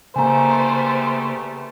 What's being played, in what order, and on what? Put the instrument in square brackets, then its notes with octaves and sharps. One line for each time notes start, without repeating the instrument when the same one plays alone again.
[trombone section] E2 G3 A3 [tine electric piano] C#3 A#3 [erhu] C5 [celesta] G#5 A#5